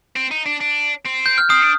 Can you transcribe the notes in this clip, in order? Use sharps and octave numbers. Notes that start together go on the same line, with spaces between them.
C4
D#4
D4
D4
C4
G6
F6
C4 D#6
D4